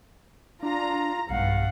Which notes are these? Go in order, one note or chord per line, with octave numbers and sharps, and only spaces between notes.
D4 F4 A#5
B1 G2 F5 F#5